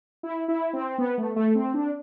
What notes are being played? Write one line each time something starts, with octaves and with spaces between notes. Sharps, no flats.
E4
E4
C4
B3
A3
A3
C4
D4